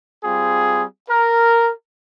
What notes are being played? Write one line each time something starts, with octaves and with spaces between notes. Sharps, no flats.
G3 C4 F4 G#4
A#4